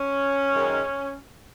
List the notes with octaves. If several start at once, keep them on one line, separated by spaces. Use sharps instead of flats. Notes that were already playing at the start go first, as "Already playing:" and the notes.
Already playing: C#4
F#2 D#3 G#3